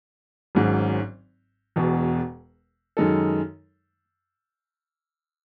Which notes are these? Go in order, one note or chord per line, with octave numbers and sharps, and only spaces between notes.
G#1 G#2 F#3 C#4
E1 E2 B2
F#2 D#3 G#3 D#4 A4